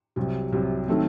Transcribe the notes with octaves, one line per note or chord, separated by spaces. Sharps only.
C2 C3 F#3
C2 C3 F#3
D#3 F#3 A3 C4